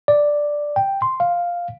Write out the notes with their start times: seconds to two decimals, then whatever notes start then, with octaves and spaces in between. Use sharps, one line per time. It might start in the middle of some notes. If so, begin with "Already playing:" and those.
0.08 D5
0.76 G5
1.02 C6
1.20 F5